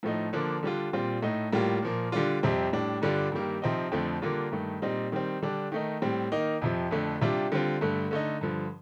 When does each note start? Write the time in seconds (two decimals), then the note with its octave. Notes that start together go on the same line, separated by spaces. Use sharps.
0.03 A2 F3 A3 D#4
0.33 D3 F3 A#3 D4
0.63 D3 G3 D4 F4
0.93 A#2 G3 C4 F4
1.22 A2 A3 D#4
1.53 A2 G3 A#3 F4
1.82 A#2 F3 A#3
2.12 D3 G3 D4 F4
2.43 F2 C3 G3 C4
2.73 A2 G3 D4
3.02 G2 D3 G3 D4 F4
3.32 G2 D#3 G3 A#3
3.62 C3 F3 C4 D#4
3.92 F2 D3 F3 A3 C4
4.22 D3 G3 A#3 D4 F4
4.52 G2 D#3 A3
4.82 A#2 G3 C4 D#4
5.12 D#3 G3 C4
5.42 D3 G3 D4
5.72 D#3 A3 D#4
6.02 A2 G3 C4
6.32 D#3 A#3 D#4
6.62 F2 C3 F3
6.91 F2 D3 A3
7.21 C3 G3 D4 F4
7.52 D3 G3 C4 F4
7.81 G2 D3 A3
8.11 D3 A3 D#4
8.41 G2 D3 F3